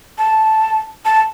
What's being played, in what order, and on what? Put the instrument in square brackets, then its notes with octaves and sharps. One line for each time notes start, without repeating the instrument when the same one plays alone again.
[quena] A5
A5